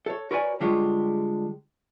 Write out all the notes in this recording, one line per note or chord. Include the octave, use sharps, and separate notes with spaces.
A4 C#5
F#4 A#4 B4 C#5 D5 G#5
D3 G3 G#3 F4 G4 C#5